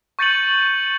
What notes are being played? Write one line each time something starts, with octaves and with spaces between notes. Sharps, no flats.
C#6 G6 A6 C#7 D#7 F#7